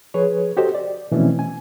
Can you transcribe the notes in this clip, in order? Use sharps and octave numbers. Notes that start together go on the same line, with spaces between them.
F3 G#4 B4 C#5
F#4 G4 A4 C5 D#5
D5
B2 E3 F3 A3 C4 C#4
G#5